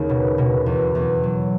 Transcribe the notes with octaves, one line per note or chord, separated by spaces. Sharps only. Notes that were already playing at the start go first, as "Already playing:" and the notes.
Already playing: D#2 C#3
B2
B2
E2
E2
F#3